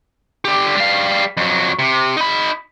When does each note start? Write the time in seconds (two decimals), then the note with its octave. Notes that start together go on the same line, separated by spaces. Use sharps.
0.45 D3 G4
0.76 G3 F5
1.37 F2 F#3
1.79 C3
2.17 D#4 B5